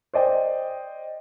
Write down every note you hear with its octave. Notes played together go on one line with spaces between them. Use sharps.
C5 D5 D#5 G5